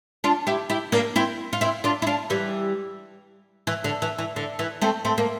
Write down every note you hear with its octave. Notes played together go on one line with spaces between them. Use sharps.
D4 F4
E4 G4
E4 G4
A#3 D4
C4 E4
F4
C4 E4
D4 F4
E4
D4 F4
E3 G3
E3
D3
E3
E3
D3
E3
A3 C4
A3 C4
A#3